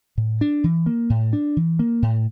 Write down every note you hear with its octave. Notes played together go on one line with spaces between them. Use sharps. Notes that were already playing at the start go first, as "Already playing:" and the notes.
A2
D4
E3
A#3
A2
D4
E3
A#3
A2